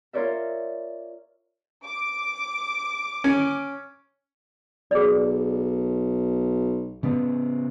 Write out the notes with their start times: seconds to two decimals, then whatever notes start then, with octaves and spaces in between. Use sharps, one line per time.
0.13 F4 A#4 C#5 D5 E5
1.85 D6
3.24 C#4
4.91 B1 G#4 D5
7.03 C#3 B3